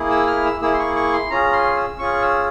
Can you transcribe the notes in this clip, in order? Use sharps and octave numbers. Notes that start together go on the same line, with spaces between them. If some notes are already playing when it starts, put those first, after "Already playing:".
Already playing: A#3 E4 G#4
E6
F6
E6
A#3 E4 G#4 E6
C6
C#6
C#6
C6
C#4 F4 G#4 A#5
C6
E6
C#4 F4 G#4 C#6
E6